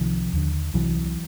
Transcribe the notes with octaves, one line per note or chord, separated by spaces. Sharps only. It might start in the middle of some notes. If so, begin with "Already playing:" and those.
Already playing: C2 C3 D#3 F3
D#2 D3
C2 C3 E3 F#3